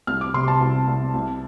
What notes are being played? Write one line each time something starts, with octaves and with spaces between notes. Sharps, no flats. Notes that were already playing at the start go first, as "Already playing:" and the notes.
C2 F6
D6
C3 C6
A5
C2
C2
C2